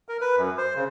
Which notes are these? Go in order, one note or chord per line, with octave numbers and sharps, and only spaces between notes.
A#4
B4
F#2
C5
C#3